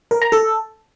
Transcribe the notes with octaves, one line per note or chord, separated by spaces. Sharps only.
A#4
A#5
A4